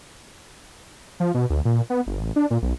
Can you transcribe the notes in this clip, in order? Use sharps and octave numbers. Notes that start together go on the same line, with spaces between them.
F3
B2
D2
A#2
B3
G1
A1
D4
A#2
B1